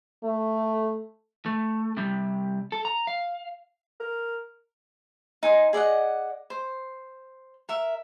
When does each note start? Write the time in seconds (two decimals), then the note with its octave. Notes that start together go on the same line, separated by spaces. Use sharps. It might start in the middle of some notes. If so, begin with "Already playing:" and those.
0.24 A3
1.46 A3
1.97 C3 G3
2.72 A4
2.85 A#5
3.07 F5
4.00 A#4
5.43 D#4 G#5 C6
5.73 G#4 D5 D#5 F#5
6.50 C5
7.69 A#4 E5